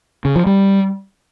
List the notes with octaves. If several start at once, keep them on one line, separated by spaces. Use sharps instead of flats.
C#3
F3
G3